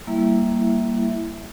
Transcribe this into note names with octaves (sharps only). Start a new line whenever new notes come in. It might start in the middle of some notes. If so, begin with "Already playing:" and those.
G3 A#3 E4 E5